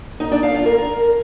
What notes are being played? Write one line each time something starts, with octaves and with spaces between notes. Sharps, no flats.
D#4
D4
F5
F4
A#4